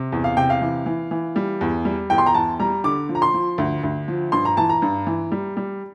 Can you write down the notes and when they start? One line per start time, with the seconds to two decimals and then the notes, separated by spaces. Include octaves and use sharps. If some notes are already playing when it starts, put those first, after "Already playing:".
Already playing: C3
0.12 E2
0.24 F5
0.37 C3 G5
0.50 F5
0.62 E3
0.86 E3
1.11 E3
1.36 G3
1.61 E2
1.85 G3
2.10 E2 G5
2.18 C6
2.26 A#5
2.34 E2 A5
2.60 G3 A#5
2.84 D3 D6
3.09 F3
3.15 A#5
3.22 C6
3.34 F3
3.58 D2
3.83 D2
4.08 F3
4.32 G2 C6
4.45 A#5
4.57 E3 A5
4.69 A#5
4.82 G2
5.07 E3
5.32 G3
5.57 G3